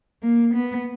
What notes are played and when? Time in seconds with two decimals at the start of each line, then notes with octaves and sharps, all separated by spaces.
0.23 A#3
0.54 B3